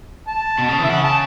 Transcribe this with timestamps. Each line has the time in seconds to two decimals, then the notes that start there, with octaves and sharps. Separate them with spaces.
0.27 A5
0.58 B2
0.69 C#3
0.79 E3 E5
0.89 C#3 F#5
1.04 A5